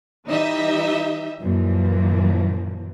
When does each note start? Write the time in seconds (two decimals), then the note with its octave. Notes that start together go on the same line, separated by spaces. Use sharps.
0.27 E3 G3 D#4 D#5 E5
1.41 F#2 A#2 E3 F3